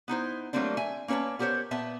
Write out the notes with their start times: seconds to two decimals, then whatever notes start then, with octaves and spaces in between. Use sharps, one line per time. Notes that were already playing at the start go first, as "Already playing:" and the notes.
0.08 B3 D#4 E4 C5
0.53 F#3 G3 A3 A#3 C4 D4
0.77 E5 G#5
1.08 A#3 C#4 B4 C#5 A5
1.39 B3 G4 A#4 C5 C#5
1.71 A#2 B3 E5 A5